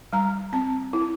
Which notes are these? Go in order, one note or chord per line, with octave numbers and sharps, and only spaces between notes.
G3 A#5
C4 A5
E4